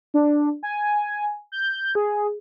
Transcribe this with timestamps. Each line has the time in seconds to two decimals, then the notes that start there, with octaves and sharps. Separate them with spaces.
0.14 D4
0.63 G#5
1.52 G6
1.95 G#4